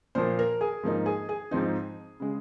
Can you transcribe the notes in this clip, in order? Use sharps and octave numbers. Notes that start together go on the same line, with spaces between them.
A#2 F3 A#3 C5
A#4
G#4
G#2 F3 A#3 D#4
G#4
G#4
G#2 F3 C4 D#4
C#3 G#3